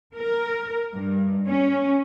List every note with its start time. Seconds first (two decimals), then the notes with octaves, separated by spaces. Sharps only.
0.15 A#4
0.95 G2
1.47 C#4